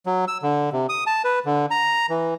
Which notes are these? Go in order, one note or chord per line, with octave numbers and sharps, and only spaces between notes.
F#3
E6
D3
C3
D#6
A5
B4
D3
A#5
E3